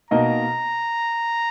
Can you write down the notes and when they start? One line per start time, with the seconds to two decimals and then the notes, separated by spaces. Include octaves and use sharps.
0.11 B2 A#3 D#4 A#4 D#5 A#5